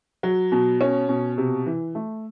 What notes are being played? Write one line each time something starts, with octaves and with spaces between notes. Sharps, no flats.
F#3
B2
C#4
B2
C3
E3
A3